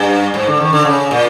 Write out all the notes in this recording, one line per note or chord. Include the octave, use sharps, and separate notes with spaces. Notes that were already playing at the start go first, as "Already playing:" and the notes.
Already playing: G2
G#2
D3
D#3
D3
C#3
A#2